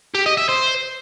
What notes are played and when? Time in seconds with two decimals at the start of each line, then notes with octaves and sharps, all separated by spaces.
0.14 G4
0.26 D#5
0.37 E5
0.49 C5